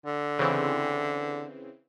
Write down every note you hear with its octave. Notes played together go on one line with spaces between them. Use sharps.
D3
C#3 E3 C4